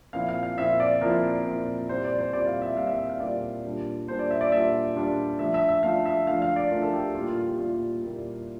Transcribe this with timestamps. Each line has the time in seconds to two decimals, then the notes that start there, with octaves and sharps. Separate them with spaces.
0.13 A#2 F3 C4 E4 F5
0.29 F5
0.43 F5
0.58 A#2 F3 C4 E4 E5
0.80 D5
1.01 A#2 F3 C4 E4 A#4
1.45 A#2 F3 C4 E4
1.89 A#2 G3 C4 E4 C5
2.04 D5
2.18 C5
2.33 A#2 G3 C4 E4 D5
2.47 F5
2.62 E5
2.76 A#2 G3 C4 E4 F5
2.87 E5
2.99 E5
3.10 F5
3.20 A#2 G3 C4 E4 D5
3.64 A#2 G3 D4 F4
4.07 A#2 G3 D4 F4 C5
4.19 D5
4.31 E5
4.41 D5
4.52 A#2 G3 D4 F4 E5
4.96 A#2 G3 D4 F4
5.39 F3 A3 D4 F4 E5
5.54 E5
5.69 E5
5.83 F3 A3 D4 F4 F5
6.06 E5
6.27 F3 A3 D4 F4 F5
6.42 F5
6.56 D5
6.70 F3 A3 D4 F4 A#4
6.82 A4
6.93 G4
7.15 A#2 G3 A#3 E4 F4
7.29 F4
7.44 G4
7.58 A#2 G3 A#3 E4 F4
8.02 A#2 G3 A#3 E4